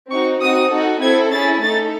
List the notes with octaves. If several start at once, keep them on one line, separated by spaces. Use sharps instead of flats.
C4 D#4 F#4 C#6
C4 D#4 F#4 D#6
D#4 F#4 A4
C4 E4 A4 G#6
C#4 E4 G#4 A6
A3 D#4 A4 A6